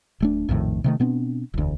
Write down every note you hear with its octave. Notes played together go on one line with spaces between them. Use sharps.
D1 A3 D4
A#1 F2 A2 D#3
C3 D#3 A3
B2 B3 C4 D4
E1 D2